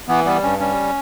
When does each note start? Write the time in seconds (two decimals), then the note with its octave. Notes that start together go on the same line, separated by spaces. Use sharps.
0.08 E3 B3
0.25 G3 B3
0.43 G2 C#4
0.60 G3 C#4